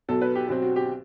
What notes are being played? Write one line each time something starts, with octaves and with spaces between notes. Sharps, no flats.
B1 B2 F#3 A4
B4
G4
B1 B2 F#3 C4 G4
F#4
G4